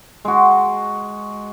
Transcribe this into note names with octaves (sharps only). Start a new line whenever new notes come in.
G#3 F#4